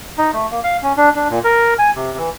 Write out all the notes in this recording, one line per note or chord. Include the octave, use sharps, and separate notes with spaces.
D#4
A3
A#3
F5
C#4
D4
D4
A#2
A#4
G#5
C3
E3